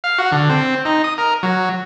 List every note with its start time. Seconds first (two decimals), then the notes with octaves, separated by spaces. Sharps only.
0.04 F5
0.18 F#4
0.32 D3
0.49 C4
0.85 D#4
1.04 D#6
1.18 A#4
1.43 F#3